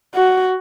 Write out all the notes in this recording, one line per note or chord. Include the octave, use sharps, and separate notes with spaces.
F#4